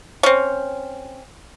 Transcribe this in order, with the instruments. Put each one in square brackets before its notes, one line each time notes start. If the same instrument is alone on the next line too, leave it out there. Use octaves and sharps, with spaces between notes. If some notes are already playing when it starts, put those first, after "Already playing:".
[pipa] C4 C#4